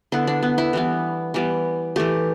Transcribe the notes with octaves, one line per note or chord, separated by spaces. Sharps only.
D3 B3 E4
D4
B3
E4
E3 G3 B3
E3 G3 B3
E3 A3 G4